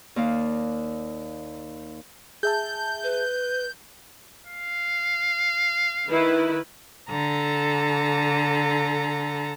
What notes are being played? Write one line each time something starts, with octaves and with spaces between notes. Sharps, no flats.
D#2 A#3 D5 F5
G#4 E5 A5 G6
B4
F5
D#3 E4 B4
D3 A4 A#5